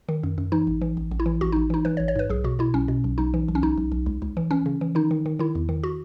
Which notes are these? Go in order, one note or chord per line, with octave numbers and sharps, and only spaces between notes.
D#3
F#2
F#2
E3 D#4
A1
E3
A1
A1
E4
E3
A1 F#4
A1 D#4
E3 D#4
E3 B4
C#5
A1
C#5
G#2 B4
B1 G#4
B2 F#4
B2 E4
B1 C#4
B2
B1
B1 D#4
E3
B1
C#4
B1 D#4
B1
B1
C#2
C#2
E3
E3 C#4
C#3
E3
D#3 D#4
D#3
D#3
D#3 E4
E2
D#3
F#4